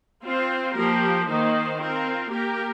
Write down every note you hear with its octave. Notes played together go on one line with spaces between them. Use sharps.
C4 F4 C5
F3 A#3 G4 A#4
D#3 A#3 D#4 C5
C4 F4 A#4
A#3 G4 A#4